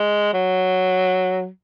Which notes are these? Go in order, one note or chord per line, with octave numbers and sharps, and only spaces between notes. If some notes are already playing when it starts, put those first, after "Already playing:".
Already playing: G#3
F#3